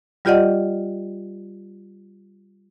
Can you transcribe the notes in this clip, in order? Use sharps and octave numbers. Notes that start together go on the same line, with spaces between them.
G3 F4 G4 D5 D#5 F#5